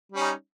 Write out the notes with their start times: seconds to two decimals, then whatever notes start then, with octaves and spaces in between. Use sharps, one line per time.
0.12 G3
0.16 C#4
0.20 D#4